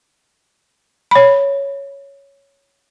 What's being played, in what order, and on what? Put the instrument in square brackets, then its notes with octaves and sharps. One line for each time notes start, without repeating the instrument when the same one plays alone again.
[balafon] C#5 B5